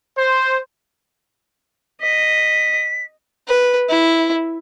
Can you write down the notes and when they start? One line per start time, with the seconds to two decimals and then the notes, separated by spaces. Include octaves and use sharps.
0.15 C5
2.01 D#5 B6
3.47 B4
3.89 E4